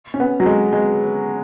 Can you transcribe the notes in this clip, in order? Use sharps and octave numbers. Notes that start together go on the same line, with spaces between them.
C#4
B3
F#3
G#3
G#3